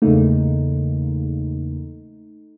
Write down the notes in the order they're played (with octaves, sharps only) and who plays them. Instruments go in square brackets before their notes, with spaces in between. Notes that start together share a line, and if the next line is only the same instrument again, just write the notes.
[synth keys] E2 C#3 A#3 [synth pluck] A3 D#4